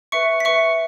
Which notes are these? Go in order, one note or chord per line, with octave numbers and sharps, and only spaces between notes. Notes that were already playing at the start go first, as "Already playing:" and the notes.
B4 E5 C#6 C#7
B6
B4 E5 C#6 C#7